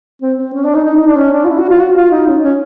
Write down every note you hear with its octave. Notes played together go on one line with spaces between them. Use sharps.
C4
C4
C#4
D4
D#4
D#4
D#4
D4
C#4
D4
F4
E4
F#4
F4
F#4
F4
D#4
C#4
C#4